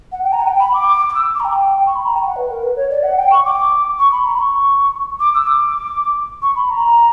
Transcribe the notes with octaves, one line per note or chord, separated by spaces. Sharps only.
F#5
G5
A#5
F#5
G5
B5
D6
D6
E6
D6
A#5
G5
C#6
B5
A#5
G5
F#5
B4
A#4
B4
C#5
D5
F#5
G5
C#6
D6
C#6
B5
A#5
B5
C#6
D6
E6
D6
C#6
B5
A#5